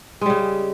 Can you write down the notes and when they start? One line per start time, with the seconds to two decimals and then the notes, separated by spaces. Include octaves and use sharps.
0.21 G#3
0.26 G3
0.30 C#3